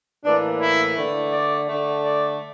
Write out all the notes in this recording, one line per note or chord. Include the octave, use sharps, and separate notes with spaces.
A2 E3 A#3 D4
E4
D3 A3
D5
D3 A3
D5